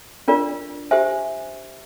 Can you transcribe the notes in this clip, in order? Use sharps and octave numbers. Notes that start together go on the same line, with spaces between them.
D4 F4 A#4 D5
G4 C5 E5 G#5